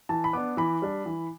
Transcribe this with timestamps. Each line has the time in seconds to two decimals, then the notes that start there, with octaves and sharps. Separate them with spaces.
0.09 E3 A5
0.24 B5
0.33 B3 D4 D6
0.57 E3 B5
0.82 G3 D4
1.06 E3